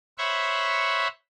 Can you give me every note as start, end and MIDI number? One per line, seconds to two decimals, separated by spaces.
0.18 1.08 72
0.18 1.08 73
0.18 1.08 76
0.18 1.08 78
0.18 1.08 83
0.18 1.08 85